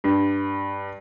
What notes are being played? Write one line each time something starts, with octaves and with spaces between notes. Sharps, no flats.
G2